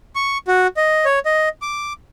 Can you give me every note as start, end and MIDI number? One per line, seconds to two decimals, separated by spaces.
0.16 0.38 85
0.48 0.67 66
0.77 1.05 75
1.05 1.19 73
1.26 1.49 75
1.62 1.93 86